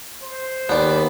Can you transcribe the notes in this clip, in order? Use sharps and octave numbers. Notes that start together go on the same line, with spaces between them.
C5
D#2 B3 D5